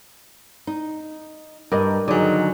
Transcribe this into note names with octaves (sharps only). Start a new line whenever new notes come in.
D#4
G2 A#4 D5 D#5
D3 D#3 F#3 D#4 G#4 D5 D#5